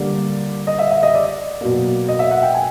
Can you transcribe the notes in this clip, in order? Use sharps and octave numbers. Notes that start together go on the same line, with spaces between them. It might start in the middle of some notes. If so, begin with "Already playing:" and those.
Already playing: D3 G3 A#3 D5
D#5
E5
E5
D#5
D5
B2 F#3 A#3
D#5
E5
F#5
G5
G#5